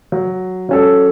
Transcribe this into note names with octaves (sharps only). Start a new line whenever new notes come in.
F#3
F#3 C#4 A4